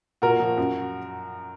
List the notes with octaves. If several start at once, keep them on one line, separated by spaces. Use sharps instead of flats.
A#2 F#4 A#4
F3
F#2